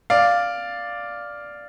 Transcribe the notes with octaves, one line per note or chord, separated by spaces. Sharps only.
D5 F5